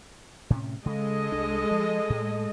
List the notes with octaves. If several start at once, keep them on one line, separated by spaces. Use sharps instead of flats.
A2 C3 C#4
C#3 G#3 A4 D#5
C2 D4
F3
A2